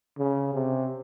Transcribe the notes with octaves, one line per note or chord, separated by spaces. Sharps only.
C#3
C3